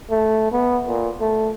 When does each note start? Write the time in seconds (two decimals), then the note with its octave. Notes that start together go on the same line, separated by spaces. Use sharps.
0.10 A3
0.52 B3
0.88 A#2
1.21 A3